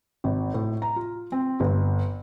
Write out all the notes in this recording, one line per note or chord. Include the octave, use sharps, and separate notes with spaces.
G#1
A2
A#5
F4
C4
G1